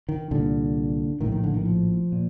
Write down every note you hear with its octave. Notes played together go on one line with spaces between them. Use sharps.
D#3
C2 A#2 D3
A#1 A2 D#3
D#3
D3
D#3
F3
A#2